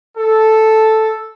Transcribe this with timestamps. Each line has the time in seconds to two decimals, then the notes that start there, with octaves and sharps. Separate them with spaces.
0.18 A4